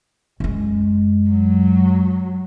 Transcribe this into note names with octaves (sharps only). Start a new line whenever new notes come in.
F#2 G#3
F#3